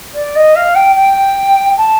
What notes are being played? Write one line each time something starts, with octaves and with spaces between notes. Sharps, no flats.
D5
D#5
F5
G5
G5
A5